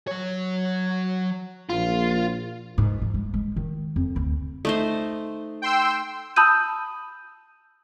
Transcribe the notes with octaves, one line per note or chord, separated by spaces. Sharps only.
F#3 C#5
A#1 F4
G#2
F3
G#3
G#3
D#3
F2
D2
A3 D#4 C5
G5 C6 E6
A5 B5 D#6 E6 G6 D#7